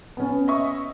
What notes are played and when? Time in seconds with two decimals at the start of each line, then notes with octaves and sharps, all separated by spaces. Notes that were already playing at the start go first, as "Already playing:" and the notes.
0.17 B3 C#4
0.48 D#5 E5 C#6